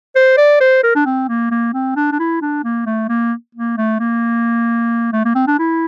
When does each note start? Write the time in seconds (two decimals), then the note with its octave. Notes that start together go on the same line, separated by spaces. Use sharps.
0.16 C5
0.38 D5
0.61 C5
0.83 A#4
0.96 D4
1.06 C4
1.28 A#3
1.51 A#3
1.74 C4
1.96 D4
2.12 D4
2.19 E4
2.42 D4
2.64 A#3
2.86 A3
3.09 A#3
3.55 A#3
3.77 A3
4.00 A#3
5.13 A3
5.25 A#3
5.35 C4
5.47 D4
5.59 E4